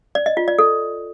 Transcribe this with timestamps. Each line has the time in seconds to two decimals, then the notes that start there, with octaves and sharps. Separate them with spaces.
0.15 D5
0.26 D#5
0.37 F4
0.48 D5
0.59 A4